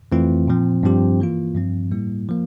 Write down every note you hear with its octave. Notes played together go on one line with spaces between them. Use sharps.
F2 E3 A3 C4 F4
A#2 F3 C4
G2 F3 C4 G4
E3 A#3 F4
G2 F3 C4
A2 G3 A#3 E4
F3 A#3